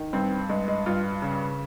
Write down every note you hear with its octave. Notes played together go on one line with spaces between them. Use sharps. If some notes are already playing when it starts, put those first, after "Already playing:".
Already playing: D#3
G2 C4
G2 G#3
G#3
G2 F4
C#3